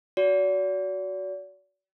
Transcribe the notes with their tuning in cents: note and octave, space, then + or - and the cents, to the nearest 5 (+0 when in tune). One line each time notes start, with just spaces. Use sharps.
F#4 +0 D5 -40